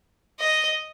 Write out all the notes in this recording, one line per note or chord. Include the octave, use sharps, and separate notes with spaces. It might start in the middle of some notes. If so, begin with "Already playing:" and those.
D#5